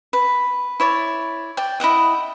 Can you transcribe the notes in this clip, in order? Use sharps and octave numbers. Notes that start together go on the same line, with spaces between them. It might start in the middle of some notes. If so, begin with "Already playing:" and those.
B4
E4 C#5 D5
D5 G5
E4 D#5 F#5 G5